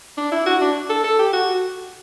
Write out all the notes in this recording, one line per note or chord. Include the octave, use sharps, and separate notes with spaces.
D4
E4
F#4
D4
A4
A4
G4
F#4